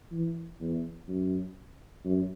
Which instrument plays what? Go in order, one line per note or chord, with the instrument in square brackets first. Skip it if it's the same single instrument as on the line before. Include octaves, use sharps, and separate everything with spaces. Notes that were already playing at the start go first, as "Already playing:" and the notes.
[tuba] E3
E2
F#2
F#2